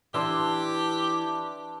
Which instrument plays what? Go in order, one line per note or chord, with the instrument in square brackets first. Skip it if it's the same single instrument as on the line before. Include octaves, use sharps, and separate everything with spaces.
[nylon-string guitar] E3 [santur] D4 C6 E6 [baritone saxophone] G4